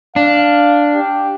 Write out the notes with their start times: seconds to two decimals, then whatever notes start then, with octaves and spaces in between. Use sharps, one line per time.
0.16 D4 F5
0.95 G4